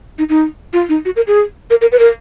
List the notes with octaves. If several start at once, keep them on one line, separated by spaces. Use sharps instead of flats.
D#4
D#4
F4
D#4
F#4
A#4
G#4
A#4
A#4
B4
A#4